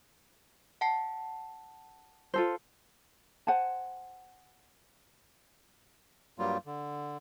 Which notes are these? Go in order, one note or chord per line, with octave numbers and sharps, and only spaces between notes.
F#5 A5 C7
F4 A4 C5
C5 F#5 G#5 A5
G2 F#3 G3 A#3 F4
D3